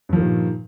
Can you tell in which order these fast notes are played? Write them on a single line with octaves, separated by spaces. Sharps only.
G2 F3 D#3 A#2